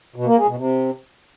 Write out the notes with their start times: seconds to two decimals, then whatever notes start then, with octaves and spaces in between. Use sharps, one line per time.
0.16 B2
0.26 A#3
0.37 G#3
0.47 B2
0.58 C3